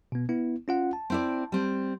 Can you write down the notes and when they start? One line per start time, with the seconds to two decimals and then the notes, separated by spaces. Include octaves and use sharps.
0.12 B2 B3
0.29 B3 E4
0.68 C#4 F4 F#5
0.93 A5
1.10 C4 E4 D5
1.52 G3 C4